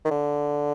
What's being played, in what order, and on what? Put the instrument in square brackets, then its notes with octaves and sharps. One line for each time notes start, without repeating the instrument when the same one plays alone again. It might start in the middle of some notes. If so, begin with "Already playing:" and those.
[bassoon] D#3
D3